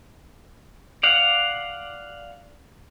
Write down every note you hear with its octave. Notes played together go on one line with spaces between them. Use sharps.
D5 F5 F#5